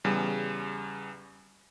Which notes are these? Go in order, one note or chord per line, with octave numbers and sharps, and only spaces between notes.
E2 C#3 G3